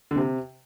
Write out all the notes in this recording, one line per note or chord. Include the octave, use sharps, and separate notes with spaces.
D3
C3